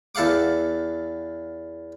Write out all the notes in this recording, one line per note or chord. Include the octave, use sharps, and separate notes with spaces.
E2 A4 F5 F#5 D6